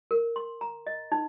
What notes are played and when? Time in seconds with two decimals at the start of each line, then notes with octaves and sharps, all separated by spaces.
0.11 A#4
0.36 C6
0.61 A#5
0.87 D#5
1.12 D#4